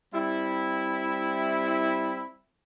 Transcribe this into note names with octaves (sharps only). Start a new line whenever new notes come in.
G3 C4 E4